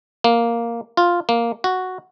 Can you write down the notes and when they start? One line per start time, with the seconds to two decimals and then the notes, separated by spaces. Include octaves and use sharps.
0.24 A#3
0.97 F4
1.29 A#3
1.64 F#4